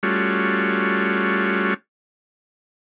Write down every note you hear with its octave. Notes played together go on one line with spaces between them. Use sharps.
G3 A3 C#4 F4 F#4